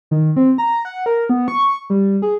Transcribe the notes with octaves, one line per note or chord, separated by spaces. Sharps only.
D#3
C4
A#5
F#5
A#4
B3
C#6
G3
G#4